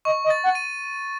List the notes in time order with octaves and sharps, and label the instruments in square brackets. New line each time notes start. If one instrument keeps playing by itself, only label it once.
[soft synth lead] D#5 [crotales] C#6
[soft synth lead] D#5
[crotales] A6
[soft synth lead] F#5
[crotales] D#7